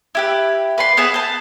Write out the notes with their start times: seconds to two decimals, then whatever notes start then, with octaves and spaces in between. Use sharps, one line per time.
0.15 E4 G4 B4
0.78 B4 D5 C6
0.97 B3 G#4 B4 E5
1.14 A5 G6